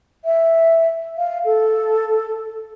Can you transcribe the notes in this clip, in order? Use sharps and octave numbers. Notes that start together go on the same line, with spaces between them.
E5
F5
A4